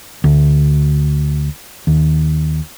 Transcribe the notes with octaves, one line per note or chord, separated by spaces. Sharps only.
D2
D#2